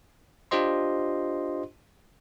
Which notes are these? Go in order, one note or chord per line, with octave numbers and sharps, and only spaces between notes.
D4 F4 G4 C5 D#5 C6